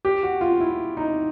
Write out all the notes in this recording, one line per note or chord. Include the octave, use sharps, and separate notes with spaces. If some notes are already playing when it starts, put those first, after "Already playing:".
G4
F#4
F4
E4
D#4